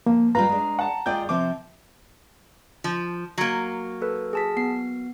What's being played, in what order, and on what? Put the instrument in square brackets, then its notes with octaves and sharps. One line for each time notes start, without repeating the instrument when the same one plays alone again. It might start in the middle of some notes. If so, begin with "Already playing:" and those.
[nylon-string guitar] F3 [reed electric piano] A#3
[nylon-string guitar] G3 F4 B4 [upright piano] F5 [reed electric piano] A#5
[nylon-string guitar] G#3 D4
[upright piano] F#5 A5
[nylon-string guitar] G#3 F4 D#5 [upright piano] D5 G5 G6
[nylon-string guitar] C3 F3 C4 [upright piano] D6
[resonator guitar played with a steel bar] F3
F#3 A#3
[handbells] A4 B4
G#4 A5 B6
B3 C7